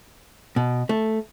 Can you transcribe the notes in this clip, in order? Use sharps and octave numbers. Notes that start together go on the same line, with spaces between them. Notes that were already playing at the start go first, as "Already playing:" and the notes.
B2
A3